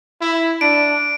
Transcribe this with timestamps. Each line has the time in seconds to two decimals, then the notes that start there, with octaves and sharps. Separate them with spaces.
0.21 E4
0.61 D4 D7